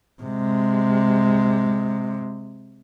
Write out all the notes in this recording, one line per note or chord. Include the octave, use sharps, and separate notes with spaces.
C3 G#3